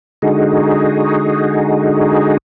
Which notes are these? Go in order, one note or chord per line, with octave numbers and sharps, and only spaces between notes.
D3 G#3 D#4 F#4 G#4